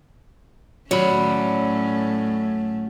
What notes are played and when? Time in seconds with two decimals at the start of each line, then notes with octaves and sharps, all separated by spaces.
0.91 A2 F#3 A3 C#4 C#5 D5 B5